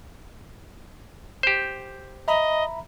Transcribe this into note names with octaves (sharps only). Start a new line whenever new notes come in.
G4 C5
D#5 E5 A#5 B5